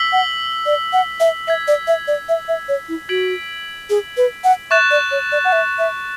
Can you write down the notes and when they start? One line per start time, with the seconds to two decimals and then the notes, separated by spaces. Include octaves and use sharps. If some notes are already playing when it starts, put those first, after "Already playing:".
Already playing: E6 B6 F#7
0.12 F#5
0.66 D5
0.93 F#5
1.20 E5
1.47 E5 G#6 B6 F#7
1.68 D5
1.88 E5
2.08 D5
2.29 E5
2.48 E5
2.68 C#5
2.89 E4
3.09 F#4 G#6 B6 D7 F#7
3.90 G#4
4.17 B4
4.44 F#5
4.71 E5 C#6 F#6 A6 E7
4.91 D5
5.11 C#5
5.32 D5
5.45 F#5
5.52 E5
5.79 E5